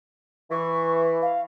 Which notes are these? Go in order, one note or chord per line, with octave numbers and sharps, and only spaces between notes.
E3 C#6
F5